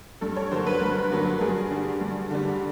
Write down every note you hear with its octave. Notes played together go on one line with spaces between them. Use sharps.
G2 A4
C#5
D3 F#3 A#3 C5
B4
G2 A#4
D3 F#3 A#3
G2 G#4
D3 G3
G2
D3 G3